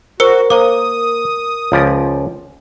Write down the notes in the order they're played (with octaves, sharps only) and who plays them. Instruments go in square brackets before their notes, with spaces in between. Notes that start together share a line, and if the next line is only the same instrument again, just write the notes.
[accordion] F#4 [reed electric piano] A#4 [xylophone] C5 E6 C#7
[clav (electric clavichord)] A#3 [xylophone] C5 D6 [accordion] D#6
[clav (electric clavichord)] C#2 F3 D5